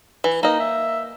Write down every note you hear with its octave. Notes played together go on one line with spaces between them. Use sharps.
E3
A#3 D#4 D#5
E5